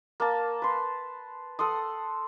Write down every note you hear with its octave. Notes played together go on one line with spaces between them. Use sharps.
A#3 A5
B4 C6
A4 F#5 C6 D#6